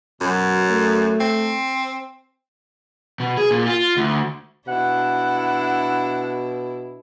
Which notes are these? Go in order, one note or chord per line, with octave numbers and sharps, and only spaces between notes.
F#2 B2 F#3 F#4
A3
C4
B2
G#4
A#2
F4
D2
B2 D4 E4 F#5